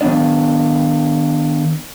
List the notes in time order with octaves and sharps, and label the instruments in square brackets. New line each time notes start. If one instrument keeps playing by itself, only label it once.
[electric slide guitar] D#3 F3 B3 D4 D5